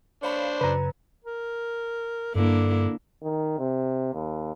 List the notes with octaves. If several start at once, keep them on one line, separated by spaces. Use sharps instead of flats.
D4 C5 C#5 F5 B5
F#2 C#3 B4 A#5
A#4
G2 D3 A#3 D4 E4
D#3
C3
D#2